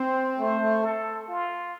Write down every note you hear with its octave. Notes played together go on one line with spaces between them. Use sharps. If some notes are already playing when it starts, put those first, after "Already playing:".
Already playing: C4 C5
A3 C5
A3
A4
F4